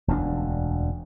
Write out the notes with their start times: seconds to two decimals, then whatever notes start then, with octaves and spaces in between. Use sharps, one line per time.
0.08 E1 D2 C4 D4